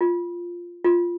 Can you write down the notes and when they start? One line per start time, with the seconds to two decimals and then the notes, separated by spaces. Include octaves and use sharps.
0.01 F4
0.84 F4